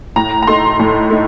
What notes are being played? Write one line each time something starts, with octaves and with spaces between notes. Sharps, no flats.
A2 A#5
A#5
A3 D#4 C6
A2
A3 D#4